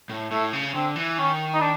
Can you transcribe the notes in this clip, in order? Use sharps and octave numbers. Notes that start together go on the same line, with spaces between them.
A2
A2 A3
C#3
D3 C4
E3
D#3 C#4
D#4
D4